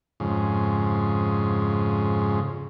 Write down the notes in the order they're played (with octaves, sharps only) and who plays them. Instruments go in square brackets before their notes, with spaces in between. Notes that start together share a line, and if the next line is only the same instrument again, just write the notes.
[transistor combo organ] F2 G#2 C#3